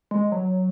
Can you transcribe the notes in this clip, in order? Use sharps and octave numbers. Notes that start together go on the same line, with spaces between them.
G#3
F#3